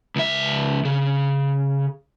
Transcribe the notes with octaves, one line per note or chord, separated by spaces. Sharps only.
C#2 E5
C#3